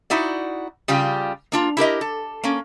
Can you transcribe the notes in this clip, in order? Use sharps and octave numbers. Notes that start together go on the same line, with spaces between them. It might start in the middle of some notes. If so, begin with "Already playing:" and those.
D#4 E4 F#4 D5
C#3 G3 F4 G4
A#3 D4 F4
E4 G4 A#4 D#5
A4
A#3 C#4